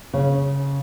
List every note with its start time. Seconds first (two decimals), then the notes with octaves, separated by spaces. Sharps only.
0.13 C#3